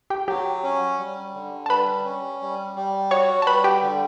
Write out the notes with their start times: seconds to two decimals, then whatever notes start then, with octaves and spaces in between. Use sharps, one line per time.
0.10 G4 G5
0.28 F#3 G4 G5
0.64 C#4
0.98 G3
1.34 D3
1.66 A5
1.69 G3 B4 B5
2.05 C#4
2.41 G3
2.76 G3
3.11 F#4 C#5 C#6
3.42 A5
3.47 G3 B4 B5
3.64 G4 G5
3.83 D3